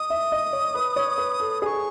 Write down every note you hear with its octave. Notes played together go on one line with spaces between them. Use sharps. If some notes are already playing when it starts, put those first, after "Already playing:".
Already playing: D#5 D#6
E5
D#5
C#5
B4
C#5
B4
A4
G#4 C#6 D#6